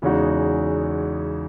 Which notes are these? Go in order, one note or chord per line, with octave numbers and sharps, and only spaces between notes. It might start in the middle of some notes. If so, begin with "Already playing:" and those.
E2 C#3 G#3 D#4 F#4